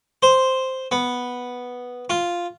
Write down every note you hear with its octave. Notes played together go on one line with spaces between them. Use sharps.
C5
B3
F4